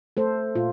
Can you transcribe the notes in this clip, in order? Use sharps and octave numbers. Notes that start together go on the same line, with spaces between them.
A3 A4 C5
A#2 F4